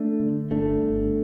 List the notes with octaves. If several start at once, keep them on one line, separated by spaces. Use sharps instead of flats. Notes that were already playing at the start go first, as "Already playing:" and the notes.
Already playing: A3 D4
D3
G1 A3 D4
G1